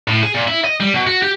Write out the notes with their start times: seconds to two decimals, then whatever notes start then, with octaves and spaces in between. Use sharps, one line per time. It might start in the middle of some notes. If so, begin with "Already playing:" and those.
0.08 A2
0.23 G#4
0.34 A#2
0.47 E4
0.64 D#5
0.80 G3
0.94 B2
1.07 F#4
1.22 G4